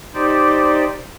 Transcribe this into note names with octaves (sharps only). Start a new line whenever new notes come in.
D#4 G4 C5 D5